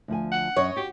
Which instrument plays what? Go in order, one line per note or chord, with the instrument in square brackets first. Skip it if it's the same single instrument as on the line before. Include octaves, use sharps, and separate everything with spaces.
[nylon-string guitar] D2 F3 G#5
[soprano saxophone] F#5
[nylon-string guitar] F#2 [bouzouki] C#5 D#5
[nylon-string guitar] F#4 [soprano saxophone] G4